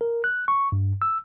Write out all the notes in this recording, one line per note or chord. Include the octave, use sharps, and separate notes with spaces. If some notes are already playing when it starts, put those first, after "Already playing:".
A#4
F#6
C#6
G2
E6